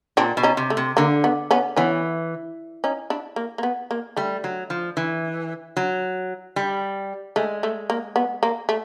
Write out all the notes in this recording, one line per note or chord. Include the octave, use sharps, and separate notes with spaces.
A#2 C4 D4
B2
C#4 D#4
C3
A3
C3
D3 A#3
B3
B3 C#4
E3 B3 C#4
C#4 D#4
D4 E4
A#3
A#3
B3
A#3
G3 A3
F#3
F3
E3
F#3
G3
G#3 A3
A3
A#3
B3
A#3
A3